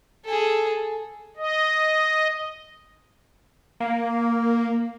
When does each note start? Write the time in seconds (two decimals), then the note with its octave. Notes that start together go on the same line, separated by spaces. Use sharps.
0.25 G#4 A4
1.37 D#5
3.80 A#3